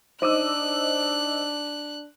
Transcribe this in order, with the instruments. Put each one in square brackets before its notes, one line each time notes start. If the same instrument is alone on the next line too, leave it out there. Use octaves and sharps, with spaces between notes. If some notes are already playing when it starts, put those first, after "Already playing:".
[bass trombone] D4 [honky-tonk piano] D#4 D6 D#7 [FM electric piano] C5 D#5 E6 [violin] F#6